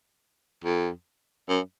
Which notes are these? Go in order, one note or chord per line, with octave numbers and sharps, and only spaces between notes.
F2
F#2